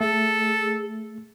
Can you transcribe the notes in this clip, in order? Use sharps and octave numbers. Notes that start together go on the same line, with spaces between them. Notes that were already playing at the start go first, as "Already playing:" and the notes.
A3 G#4 A4